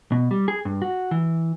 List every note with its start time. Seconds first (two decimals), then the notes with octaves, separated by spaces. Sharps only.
0.12 B2
0.31 G3
0.48 G#4
0.65 G2
0.82 F#4
1.11 E3